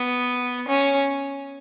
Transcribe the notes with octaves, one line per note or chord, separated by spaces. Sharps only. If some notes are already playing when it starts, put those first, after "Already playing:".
Already playing: B3
C#4